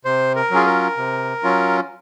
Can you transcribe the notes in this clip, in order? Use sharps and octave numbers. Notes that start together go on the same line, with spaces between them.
C3 C5
A#4
F#3 C#4 F4 G#4
A#4
C3
F#3 C#4 F4